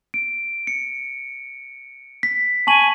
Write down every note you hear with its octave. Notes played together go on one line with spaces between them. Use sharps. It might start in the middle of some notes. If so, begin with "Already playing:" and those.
D7
C#7
B6
G#5 A5 C#6 F#7